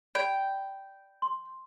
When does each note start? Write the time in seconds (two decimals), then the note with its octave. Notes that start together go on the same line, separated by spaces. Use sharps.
0.15 D5 G5 B5
1.22 C6